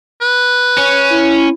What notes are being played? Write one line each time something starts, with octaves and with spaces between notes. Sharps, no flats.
B4
C#4
E4